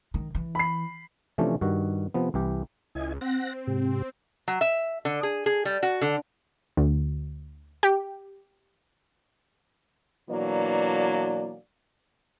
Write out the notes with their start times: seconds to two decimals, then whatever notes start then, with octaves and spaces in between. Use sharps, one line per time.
0.14 D#3
0.35 E3
0.55 B5 C7
1.38 C3 E3 F3 A3 C#4 D4
1.61 G2 D#3 F#4
2.14 C3 F3 B3
2.34 C2 E3 G4
2.95 C#2 E4 D#5 G#5
3.21 C4 F#5 A#6
3.67 G#2 C3 G4
4.48 F#3
4.61 E5
5.05 D3
5.23 G#4
5.46 G#4
5.65 G3
5.83 F#4
6.02 D3
6.77 D2
7.83 G4
10.29 B2 E3 F#3 A#3 D4 D5